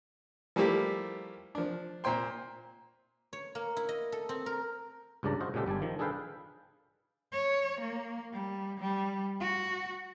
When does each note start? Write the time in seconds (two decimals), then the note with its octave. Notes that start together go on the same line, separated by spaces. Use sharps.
0.56 F3 G3 A3 A#3 E4 G4
1.55 F3 D4
2.04 A#2 C5 G5 C6
3.33 C#5
3.55 A#3
3.77 E4
3.89 D#5
4.12 A4
4.29 C4
4.46 A#4
5.23 C#2 G2 C#3 D5 A5 A#5
5.41 F#4 C5 D#5 F5
5.54 A#2 C#3 G#3 G4 A4
5.66 G1 G3 D5 G#5 A5
5.82 D#3 F3
5.99 D4 G#4 A4 B4 F5 G5
7.32 C#5
7.80 A#3
8.33 G3
8.80 G3
9.41 F#4